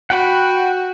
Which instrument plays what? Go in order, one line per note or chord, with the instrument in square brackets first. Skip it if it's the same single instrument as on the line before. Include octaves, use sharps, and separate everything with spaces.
[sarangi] F#4 [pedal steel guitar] F#5 G5 B5